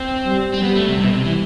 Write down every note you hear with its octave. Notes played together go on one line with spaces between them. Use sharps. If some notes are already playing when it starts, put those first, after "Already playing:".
Already playing: C4
G3
C4
G3 B3
A3
C3
B2 G3
C3
E3